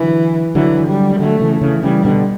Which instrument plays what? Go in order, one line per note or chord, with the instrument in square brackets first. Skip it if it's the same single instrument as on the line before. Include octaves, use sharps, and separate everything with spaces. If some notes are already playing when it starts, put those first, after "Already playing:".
Already playing: [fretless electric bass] D3 F#3 [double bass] E3
[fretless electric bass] D3 F#3 [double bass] E3
[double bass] G3
[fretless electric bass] G3
[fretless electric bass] D3 F#3 [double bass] A3
[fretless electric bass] C#3 E3
C#3 E3
[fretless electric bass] C#3 E3 [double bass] G3
[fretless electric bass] B2 D3